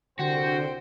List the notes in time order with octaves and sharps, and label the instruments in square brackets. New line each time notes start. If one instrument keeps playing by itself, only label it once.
[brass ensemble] C2 C5 G5 [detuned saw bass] D3 [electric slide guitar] F#4